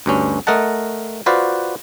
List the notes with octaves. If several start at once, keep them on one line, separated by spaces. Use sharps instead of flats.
D2 G2 C#4
A3 A#4 D#5 F#5 A5
F4 F#4 B4 C5 D5 F5